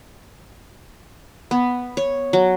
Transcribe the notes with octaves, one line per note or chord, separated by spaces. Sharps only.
B3
C#5
F#3